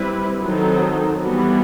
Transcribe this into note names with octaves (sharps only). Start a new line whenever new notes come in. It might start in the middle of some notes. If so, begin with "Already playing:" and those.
Already playing: G3 C4 E4 B4
D#3 F#3 C4 D#4 A4
E3 G3 B3 F#4